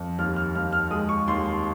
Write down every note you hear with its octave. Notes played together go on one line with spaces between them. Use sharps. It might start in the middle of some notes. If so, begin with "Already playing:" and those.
Already playing: F2
D#2 F6
F6
D#2 F6
F6
G#3 D#6
C#6
D#2 C6
C6